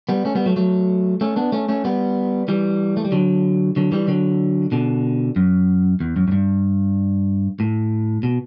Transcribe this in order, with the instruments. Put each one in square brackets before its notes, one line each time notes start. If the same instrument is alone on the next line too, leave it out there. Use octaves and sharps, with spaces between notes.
[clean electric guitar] G3 B3
A3 C#4
G3 B3
F#3 A3
F#3 A3
A3 C#4
B3 D4
A3 C#4
A3 C#4
G3 B3
E3 G3
A3
G3
D3 F#3
D3 F#3
E3 G3
D3 F#3
B2 D3
F#2
E2
F#2
F#2
G2
A2
B2